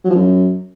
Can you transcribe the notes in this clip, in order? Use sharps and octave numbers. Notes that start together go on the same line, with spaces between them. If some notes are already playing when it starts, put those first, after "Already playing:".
F#3
F3
F#2